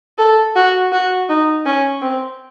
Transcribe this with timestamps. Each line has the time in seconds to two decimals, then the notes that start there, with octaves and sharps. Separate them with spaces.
0.18 A4
0.56 F#4
0.92 F#4
1.29 D#4
1.66 C#4
2.02 C4